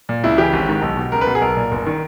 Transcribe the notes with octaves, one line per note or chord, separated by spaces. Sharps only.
A#2
C#2 E4
C#3 E3 G4
G#1
G#2 D#3
B1
B2
C#2 A#4
B4
B2
G#4
B1 A#4
A#2
G1
D#3